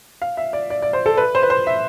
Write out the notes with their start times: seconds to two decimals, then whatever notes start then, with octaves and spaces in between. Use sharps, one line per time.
0.22 F5
0.37 E5
0.53 D5
0.70 D5
0.82 D5
0.93 C5
1.06 A4
1.17 B4
1.35 C5
1.43 B4
1.50 C5
1.67 E5